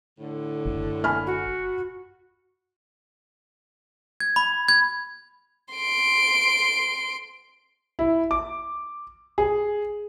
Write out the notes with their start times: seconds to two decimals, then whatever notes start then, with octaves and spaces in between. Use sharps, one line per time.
0.19 A2 D3
0.66 F#1
1.04 G#5 B5 F6
1.26 F#4
4.20 G#6
4.36 B5
4.69 G#6
5.75 C6 D7
7.99 E4
8.31 D6
9.38 G#4